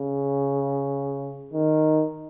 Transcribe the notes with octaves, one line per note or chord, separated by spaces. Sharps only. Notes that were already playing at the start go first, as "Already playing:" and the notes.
Already playing: C#3
D#3